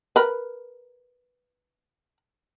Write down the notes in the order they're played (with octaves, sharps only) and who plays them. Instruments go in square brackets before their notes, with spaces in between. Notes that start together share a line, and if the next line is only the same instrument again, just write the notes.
[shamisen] A#4 B4